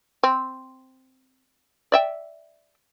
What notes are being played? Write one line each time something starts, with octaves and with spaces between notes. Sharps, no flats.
C4
D5 E5 G5